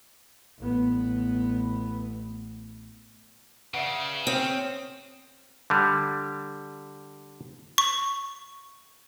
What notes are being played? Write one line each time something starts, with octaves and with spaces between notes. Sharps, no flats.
A1 B3
C#3 B4 D5 E5 F#5
C4 C#5 G5 D#6 F6
D3 G3
C#6